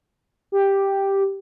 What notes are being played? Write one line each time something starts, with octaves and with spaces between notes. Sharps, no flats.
G4